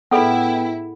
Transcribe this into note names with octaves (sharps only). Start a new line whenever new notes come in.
A2 B3 E4 G#4 A4 F#5 G5